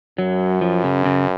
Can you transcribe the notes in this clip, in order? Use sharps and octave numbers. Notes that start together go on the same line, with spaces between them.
F#2 F#3
F3
C#3
C#3